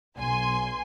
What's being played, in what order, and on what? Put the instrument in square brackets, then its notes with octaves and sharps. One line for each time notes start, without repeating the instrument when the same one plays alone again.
[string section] B1 G#5 C6